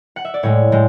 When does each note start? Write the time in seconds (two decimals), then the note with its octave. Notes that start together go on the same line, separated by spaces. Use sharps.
0.16 F#5
0.25 E5
0.34 D5
0.43 A2 G#3 C#5
0.72 A2 G#3